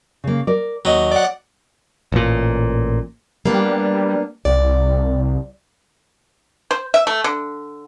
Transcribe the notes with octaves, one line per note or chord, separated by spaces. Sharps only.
C#3 A#3
A#4 D5
D#2 F#3 D#5
D5 F#5
A1 A#2
G3 A#3 B3 D4
C2 D5
C5
E5
A3
D3